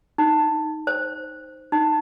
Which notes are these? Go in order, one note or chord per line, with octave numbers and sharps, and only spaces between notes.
D#4
C5
D#4